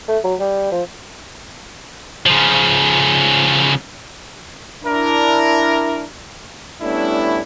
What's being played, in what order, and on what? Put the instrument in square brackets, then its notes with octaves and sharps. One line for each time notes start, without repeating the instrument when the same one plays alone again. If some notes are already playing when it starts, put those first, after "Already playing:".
[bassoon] A3
F#3
G3
F3
[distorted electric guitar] C#3 F3
[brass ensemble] D4 E4 A#4
G3 A3 B3 C#4 D4 E4